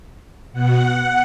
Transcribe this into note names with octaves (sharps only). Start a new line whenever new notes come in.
B2 F#5